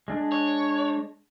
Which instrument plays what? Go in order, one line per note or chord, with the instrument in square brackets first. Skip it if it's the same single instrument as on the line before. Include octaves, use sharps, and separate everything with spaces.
[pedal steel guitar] G#3 D4
[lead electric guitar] C#5